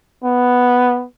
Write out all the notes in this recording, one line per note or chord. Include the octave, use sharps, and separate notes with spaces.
B3